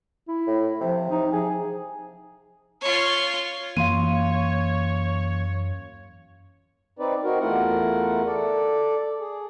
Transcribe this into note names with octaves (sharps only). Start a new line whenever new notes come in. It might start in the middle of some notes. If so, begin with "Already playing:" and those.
E4
A2
C3 F3
D#4
F3 G#4
F4 C#5
F#2 E3 A#3 C#5 F5 C6 D#7
C4 D#4 B4 D5
C4 D#4 F#4 A#4
E2 A3 E4 F4 A#4 F#5
A4 D5
G#4